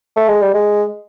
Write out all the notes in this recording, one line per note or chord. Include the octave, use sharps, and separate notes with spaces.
A3
G#3
G3
G#3